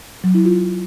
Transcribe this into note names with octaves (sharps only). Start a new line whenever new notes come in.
F#3
E4
F4